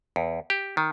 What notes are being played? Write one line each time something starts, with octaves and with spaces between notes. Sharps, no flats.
E2
G4
D#3